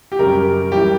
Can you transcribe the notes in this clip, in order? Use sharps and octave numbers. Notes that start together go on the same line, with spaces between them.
G4
F#2 C#3 G3 A#4
E3 G3 G4